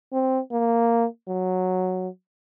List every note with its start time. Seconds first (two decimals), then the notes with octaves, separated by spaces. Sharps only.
0.12 C4
0.51 A#3
1.27 F#3